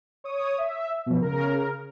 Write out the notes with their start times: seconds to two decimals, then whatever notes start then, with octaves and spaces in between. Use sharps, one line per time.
0.24 C#5 D#6
0.58 E5
1.06 B2 F3
1.22 C#3 A#4